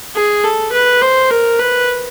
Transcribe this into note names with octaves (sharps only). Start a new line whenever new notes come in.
G#4
A4
B4
C5
A#4
B4